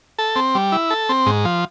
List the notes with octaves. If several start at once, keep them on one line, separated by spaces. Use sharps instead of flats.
A4
C4
G3
E4
A4
C4
G#2
F3